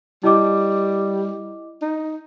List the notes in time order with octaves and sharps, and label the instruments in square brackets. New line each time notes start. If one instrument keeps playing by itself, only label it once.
[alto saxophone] G3 [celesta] E4 D#5 D6
[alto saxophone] D#4